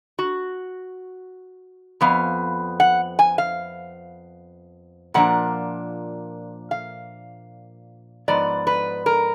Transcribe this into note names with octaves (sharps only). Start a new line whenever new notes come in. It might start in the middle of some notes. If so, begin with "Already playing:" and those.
F#4
F2 F3 B3 F5
F#5
G#5
F5
A#2 F3 A#3 D4 F#5
F5
G#2 F3 B3 D5
B4
A#4